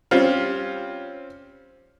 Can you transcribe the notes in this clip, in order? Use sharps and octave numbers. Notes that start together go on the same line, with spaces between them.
G3 C4 C#4 F4